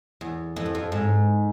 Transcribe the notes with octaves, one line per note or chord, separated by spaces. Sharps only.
E2
F2
E2
F2
G#2